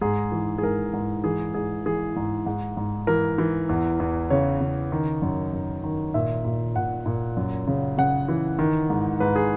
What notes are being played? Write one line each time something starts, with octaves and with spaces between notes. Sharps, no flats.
G#2 G#4
E3
G#4
G#2 A#4
G#2
E3 G#4
G#2 G#4
E3 G#4
G#2
G#2
G#2
E3 A#4
E3
E2
E2
C#3 C#5
C#3
D#3
F#2
F#2
D#3
A#2 E5
A#2
A#2 F#5
A#2
F#2
C#3
C#3 F#5
E3
D#3
G#2
G#2 B4
G#4